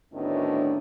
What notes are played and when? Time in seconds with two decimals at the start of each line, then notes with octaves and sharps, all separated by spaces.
0.13 D2 A2 D#3 B3 C#4 D4